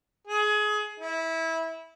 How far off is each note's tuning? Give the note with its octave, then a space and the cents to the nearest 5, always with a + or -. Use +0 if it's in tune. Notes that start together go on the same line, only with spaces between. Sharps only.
G#4 +25
E4 -20